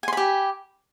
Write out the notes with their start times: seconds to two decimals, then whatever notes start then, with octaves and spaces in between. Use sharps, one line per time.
0.03 G#5
0.08 C6
0.13 B5
0.17 G4